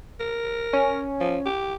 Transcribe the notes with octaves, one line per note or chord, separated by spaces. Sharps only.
A#4
C#4
F3
G4